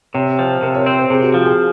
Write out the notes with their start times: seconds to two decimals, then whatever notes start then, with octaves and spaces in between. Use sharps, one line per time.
0.14 C3 C#5
0.39 F3 C5
0.62 C3 A#4
0.75 C#5
0.86 C4 C#5
0.99 C5
1.10 C3 G#4
1.22 F#4
1.34 F3 F4
1.45 G#4